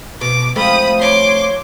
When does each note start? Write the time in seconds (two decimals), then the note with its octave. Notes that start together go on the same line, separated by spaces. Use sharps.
0.21 B2 D6
0.56 F3 G#3 A3 C4 B5 D#6
0.99 C#5 C6 D6